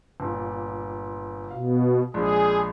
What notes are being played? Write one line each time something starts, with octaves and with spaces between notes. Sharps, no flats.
G1 A#2
B2 F5
A#1 G#3 G#4